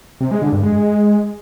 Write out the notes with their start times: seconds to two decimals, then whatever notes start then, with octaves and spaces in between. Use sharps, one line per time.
0.21 C3
0.31 G#3
0.42 D3
0.53 G2
0.63 G#3